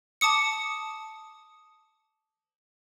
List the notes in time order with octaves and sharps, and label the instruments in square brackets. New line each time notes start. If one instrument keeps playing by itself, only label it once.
[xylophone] A5 D6 D#6 C#7